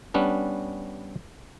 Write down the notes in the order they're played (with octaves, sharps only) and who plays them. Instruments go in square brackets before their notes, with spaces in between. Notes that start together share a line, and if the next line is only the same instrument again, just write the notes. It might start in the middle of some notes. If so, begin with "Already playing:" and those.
[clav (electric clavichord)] G3 B3 C#4 D4